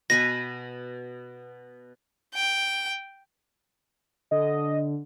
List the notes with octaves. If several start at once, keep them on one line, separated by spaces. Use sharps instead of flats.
B2 B4 G#5 A#6
G5
D3 D#5